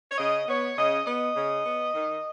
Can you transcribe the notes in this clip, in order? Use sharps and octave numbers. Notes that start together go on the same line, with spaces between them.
C#5
C#3 D#5
B3 C#5
C#3 D#5
B3 D#5
C#3
B3
D#3